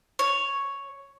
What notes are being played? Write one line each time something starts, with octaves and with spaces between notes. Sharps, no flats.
C#5